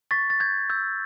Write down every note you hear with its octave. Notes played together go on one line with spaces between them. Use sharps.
C#6 A6 B6
A6
G6 G#6
E6 G6